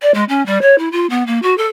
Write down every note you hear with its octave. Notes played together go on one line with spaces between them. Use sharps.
D5
G#3
C#4
G3
C#5
E4
F4
B3
A#3
F#4
A4